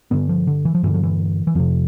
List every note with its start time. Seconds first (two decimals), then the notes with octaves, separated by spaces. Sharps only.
0.11 G2 D3 B3
0.29 F3
0.47 D3
0.65 E3
0.75 F3
0.83 G2 D3 E3
0.94 F3
1.03 E3
1.47 E3
1.55 F2 C3 F3